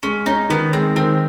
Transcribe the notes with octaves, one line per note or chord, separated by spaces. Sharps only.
G#3 C#4
C#4 D#4
D#3 B3
G#3 C4
D#3 C4